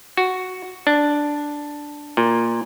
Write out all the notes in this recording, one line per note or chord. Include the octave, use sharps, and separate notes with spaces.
F#4
D4
A#2